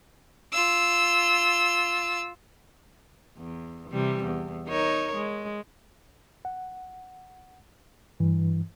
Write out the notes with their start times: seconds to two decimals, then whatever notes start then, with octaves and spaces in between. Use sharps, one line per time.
0.53 F4 E6
3.38 E2
3.91 C3 E3 G3
4.24 E2
4.68 D#4 A#4 C#5
5.15 G#3
6.45 F#5
8.20 G2 E3